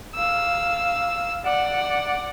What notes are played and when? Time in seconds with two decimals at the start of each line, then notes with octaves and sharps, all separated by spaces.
0.15 F5 E6
1.44 D5 F#5